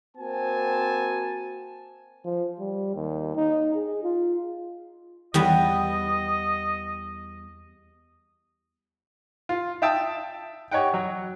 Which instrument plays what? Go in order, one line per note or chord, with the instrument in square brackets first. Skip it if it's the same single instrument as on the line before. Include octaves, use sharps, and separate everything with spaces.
[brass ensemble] A#3 C4 F#4 G#5 A5
[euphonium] F3
G3
D#2
D#4
G#4
F4
[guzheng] E2 G3 B3 [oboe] D#5
[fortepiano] F4
E5 F5 G5 A5 D#6 E6
G4 C#5 D#5 F#5 G5
F#3